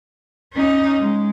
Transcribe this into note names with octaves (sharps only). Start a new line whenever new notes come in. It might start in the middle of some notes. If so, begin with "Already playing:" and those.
C#4 D#4
G#3